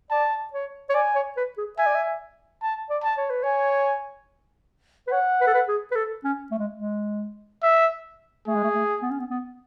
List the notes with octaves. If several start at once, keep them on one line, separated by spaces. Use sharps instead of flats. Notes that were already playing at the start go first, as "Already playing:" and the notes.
D5 A5
C#5
C#5
D5 G#5
C#5
B4
G#4
E5 G#5
D5
E5
A5
D5
A5
C#5
B4
C#5 G#5
B4
C#5 F#5
B4
A4
B4
G#4
B4
A4
C#4
A3
G#3
G#3
E5
A3 G#4
G#3
A3
A3
B3
C#4
B3
B3